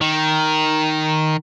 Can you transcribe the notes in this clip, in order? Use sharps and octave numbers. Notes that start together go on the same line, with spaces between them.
D#3